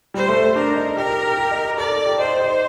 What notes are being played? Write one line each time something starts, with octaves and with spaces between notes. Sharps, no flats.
G3 C5
A3
D4 A#4
D#4
G4 A#4
G4
G4
G4
D#4
G4
A4 D5
A4
G4
D#4 C5
D#4